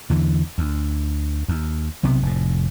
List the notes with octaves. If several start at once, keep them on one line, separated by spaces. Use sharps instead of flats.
E2 D3 E3
D2
D#2
B1 C3 B3
F1 A2